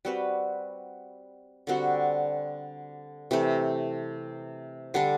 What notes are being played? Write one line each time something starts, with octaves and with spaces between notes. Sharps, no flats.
G3 C4 F#4 B4
D3 G3 C4 F#4
C3 E3 A3
D3 G3 D4 A4